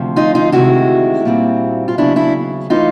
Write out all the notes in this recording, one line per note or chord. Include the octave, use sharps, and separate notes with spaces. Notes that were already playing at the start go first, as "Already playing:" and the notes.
Already playing: D2 C3 F3
D#4 F4
D#4 F4
D2 C3 D#3 G#3 E4 F#4
A#2 G3 C4
F4
D#2 C#3 F#3 B3 D4 E4
D4 E4
E3 A3 C#4 D#4 F4